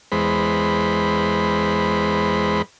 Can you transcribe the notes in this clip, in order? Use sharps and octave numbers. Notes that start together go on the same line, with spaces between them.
E2 G#3 C5 B5